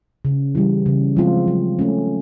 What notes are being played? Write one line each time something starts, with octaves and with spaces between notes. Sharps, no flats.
C#3
E3 G3
C#3
F3 G#3 C4 F4
F#3
A3 C#4